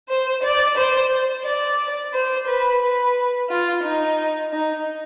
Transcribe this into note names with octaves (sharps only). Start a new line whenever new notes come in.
C5
D5
C5
D5
C5
B4
B4
F4
D#4
D#4